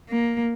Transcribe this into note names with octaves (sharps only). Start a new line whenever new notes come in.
A#3